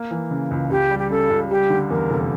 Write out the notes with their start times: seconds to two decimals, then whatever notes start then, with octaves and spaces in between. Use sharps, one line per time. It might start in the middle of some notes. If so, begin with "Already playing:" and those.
Already playing: A#3
0.11 E3
0.31 C#3
0.51 C#2
0.70 C#2 G4
0.91 G3
0.99 G4
1.10 C#3 A4
1.30 C#2
1.50 G3 G4
1.70 D3
1.90 E2 A#4
2.10 F1